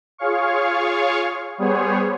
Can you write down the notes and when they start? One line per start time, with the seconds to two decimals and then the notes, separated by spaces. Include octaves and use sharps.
0.18 F4 G#4 C#5 F5 C#6
1.58 G3 B3 G#4 C5 C#5